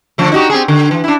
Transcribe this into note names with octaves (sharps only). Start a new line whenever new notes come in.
D3 F3 A3
D#4 F#4 G4
C4 G4 G#4
D3
E3
D4 E4